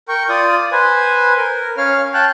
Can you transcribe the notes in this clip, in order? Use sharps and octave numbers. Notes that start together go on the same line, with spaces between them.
A#4 G5 C#6
F4 D5 D#6
B4 C5 G#5
A#4
C#4 C#5 F5 F6
F5 G5 A5 F#6